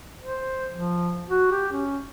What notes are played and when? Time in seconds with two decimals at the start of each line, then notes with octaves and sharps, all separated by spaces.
0.20 C5
0.72 F3
1.29 F#4
1.51 G4
1.72 C#4